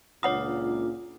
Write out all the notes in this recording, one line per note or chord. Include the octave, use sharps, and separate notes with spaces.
C#2 A#2 D4 F4 C#5 F#5 D#6